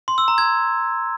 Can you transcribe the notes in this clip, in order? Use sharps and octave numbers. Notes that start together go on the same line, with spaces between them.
C6
E6
A#5
G#6